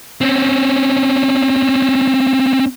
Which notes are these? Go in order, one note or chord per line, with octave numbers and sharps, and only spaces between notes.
C4 C#4